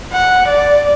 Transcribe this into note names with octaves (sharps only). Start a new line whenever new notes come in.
F#5
D5